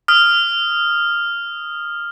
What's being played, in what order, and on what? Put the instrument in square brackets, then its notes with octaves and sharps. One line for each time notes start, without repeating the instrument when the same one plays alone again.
[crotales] D#6 F6